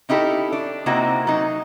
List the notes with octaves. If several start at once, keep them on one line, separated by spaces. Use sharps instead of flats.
C#4 D#4 E4 G4 A4
D4
C3 A#3 C4 D#4 E4 F#4
F#3 D#4